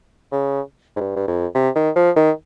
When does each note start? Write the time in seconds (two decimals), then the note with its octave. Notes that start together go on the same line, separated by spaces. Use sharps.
0.32 C#3
0.96 G#2
1.00 G2
1.16 G2
1.27 F2
1.55 C3
1.75 D#3
1.96 F3
2.16 D#3